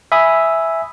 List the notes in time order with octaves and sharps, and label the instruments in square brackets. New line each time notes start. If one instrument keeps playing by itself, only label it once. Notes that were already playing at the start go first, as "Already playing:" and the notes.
[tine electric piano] E5 G#5 B5 D#6